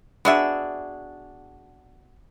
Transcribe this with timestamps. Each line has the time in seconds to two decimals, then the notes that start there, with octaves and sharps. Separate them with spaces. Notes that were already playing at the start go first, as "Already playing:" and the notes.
0.25 B3 D4 F#4 G#4 D5 E5